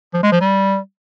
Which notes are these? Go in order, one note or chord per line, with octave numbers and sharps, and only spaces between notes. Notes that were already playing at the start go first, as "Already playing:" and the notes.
F3
G#3
F3
G3